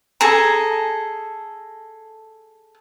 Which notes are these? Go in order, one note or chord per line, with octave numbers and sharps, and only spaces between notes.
G#4 A4 A#5